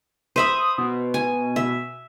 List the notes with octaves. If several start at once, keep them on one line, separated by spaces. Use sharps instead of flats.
C5 E5 B5 D#6
B2
G#5
E5